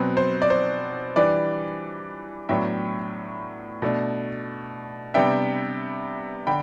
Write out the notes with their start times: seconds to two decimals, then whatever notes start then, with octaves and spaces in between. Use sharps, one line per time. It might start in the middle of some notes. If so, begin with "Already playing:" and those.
Already playing: B2 F#3 C4 B4
0.17 C5
0.42 D5
0.50 C5
1.16 E3 G3 D4 B4 D5
2.49 A2 F#3 B3 D4 E5 G5
3.82 B2 A3 D4
5.14 C3 G3 B3 D4 E5 G5
6.47 D3 G5 B5